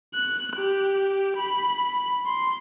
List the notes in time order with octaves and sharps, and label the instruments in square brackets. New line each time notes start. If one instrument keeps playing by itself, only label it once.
[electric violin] F#6
G4
B5
C6